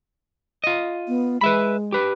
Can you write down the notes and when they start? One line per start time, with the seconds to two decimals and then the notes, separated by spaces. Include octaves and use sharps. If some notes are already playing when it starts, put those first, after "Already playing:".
0.64 F4 D#5
1.08 B3
1.41 G#3 B4 E5 B5
1.93 G4 B4